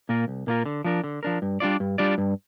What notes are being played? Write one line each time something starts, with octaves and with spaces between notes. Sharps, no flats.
A#2 A#3 F4 A#4
C2
A#2 A#3 F4 A#4
D3
F3 D4 A#4
D3
F3 D4 A#4
G2
G3 D4 F4 D5
G2
G3 D4 F4 D5
G2